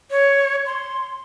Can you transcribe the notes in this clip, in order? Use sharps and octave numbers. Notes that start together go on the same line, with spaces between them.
C#5
C6